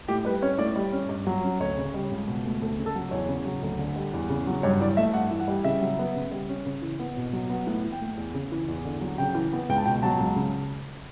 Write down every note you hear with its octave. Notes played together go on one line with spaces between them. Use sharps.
A2 G4
G3 B4
C#4 C#5
A2 D5
G3
C#4
G2
F#3
C#4
D2 C#5
C#3
G3
C#2
B2
A3
D2 A4
C#3
A4
F#3
E2 C#5
C#3
F#3
D2
D3
G3
E2
C#3
F#3
G2 C#5
E3 D5
A3 E5
G2 F#5
E3
F#5
G3
C#3 E5
F#3
B3
C#3
G3
C#4
C#3
E3
B3
B2
F#3
B3
A2 F#5
E3
G5
A3
E2
C#3
E3
E2
D3
F#3
C#3 G5
E3
B3
C#2 G5
A5
B2 G5
F#3 A5
C#2
C#3